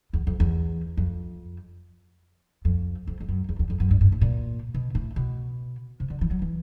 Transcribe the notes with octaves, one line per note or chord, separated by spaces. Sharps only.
E2
F2
E2
F2
F2
F2
F2
F#2
E2
E2
F2
F#2
G2
G2
A2
A#2
B2
A2
B2
C3
D3
E3
F#3
E3